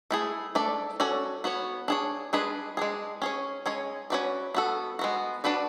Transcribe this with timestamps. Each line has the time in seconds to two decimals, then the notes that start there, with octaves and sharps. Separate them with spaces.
0.11 A3 E4 G#4
0.55 A3 D4 A4 D5
1.00 C#4 F#4 A4 D5
1.44 B3 F#4 C#5
1.88 D4 G#4 C#5
2.33 G#3 D4 G#4 B4
2.77 G#3 D4 G#4
3.22 C#4 G#4 C#5
3.66 G#3 C#4 G#4 C#5
4.10 C#4 F#4 B4 D5
4.54 B3 F#4 A4
4.99 G#3 B3 F#4
5.44 D4 F#4 B4 D5